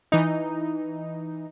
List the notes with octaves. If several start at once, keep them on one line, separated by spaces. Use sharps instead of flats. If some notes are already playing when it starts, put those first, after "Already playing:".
E3 D#4